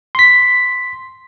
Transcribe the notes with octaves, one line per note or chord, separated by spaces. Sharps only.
C6 B6